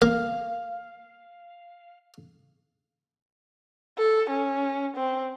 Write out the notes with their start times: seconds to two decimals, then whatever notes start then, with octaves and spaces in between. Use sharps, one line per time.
0.02 A#3 F5
3.98 A4
4.30 C#4
4.96 C4